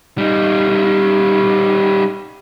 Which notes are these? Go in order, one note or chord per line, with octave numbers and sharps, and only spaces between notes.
G3 D#4